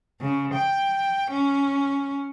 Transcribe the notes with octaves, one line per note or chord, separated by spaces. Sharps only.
C#3
G5
C#4